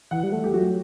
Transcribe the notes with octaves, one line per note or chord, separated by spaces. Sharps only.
E3 F#5
G3
A3
G4
F#3 F#4